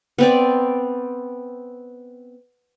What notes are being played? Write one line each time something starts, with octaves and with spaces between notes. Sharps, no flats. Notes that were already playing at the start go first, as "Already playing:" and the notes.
B3 C4 D5